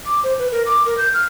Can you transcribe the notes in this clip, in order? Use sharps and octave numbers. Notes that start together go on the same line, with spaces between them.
D6
C5
B4
A#4
D6
A#4
G6
F6